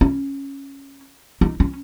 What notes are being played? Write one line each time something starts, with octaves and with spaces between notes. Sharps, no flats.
C#4
D#4
C#4